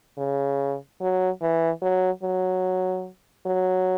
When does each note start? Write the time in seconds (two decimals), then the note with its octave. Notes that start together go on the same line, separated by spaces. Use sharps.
0.18 C#3
1.01 F#3
1.42 E3
1.82 F#3
2.23 F#3
3.46 F#3